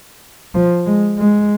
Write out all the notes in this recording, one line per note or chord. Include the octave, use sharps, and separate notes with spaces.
F3
G#3
G#3